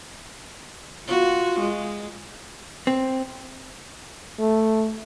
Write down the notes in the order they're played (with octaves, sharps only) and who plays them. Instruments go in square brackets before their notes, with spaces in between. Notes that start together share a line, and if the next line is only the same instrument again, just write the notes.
[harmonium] F4 [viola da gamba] F#4
[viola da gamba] G#3
[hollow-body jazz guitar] C4
[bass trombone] A3